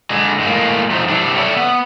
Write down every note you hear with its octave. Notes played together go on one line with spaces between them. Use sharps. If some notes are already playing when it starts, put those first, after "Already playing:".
D3 G#3
A2 G#3 A#3
F3 A3 C4 D#4
G3 C4 D4 E4
A4 C#5 D5 E5
B3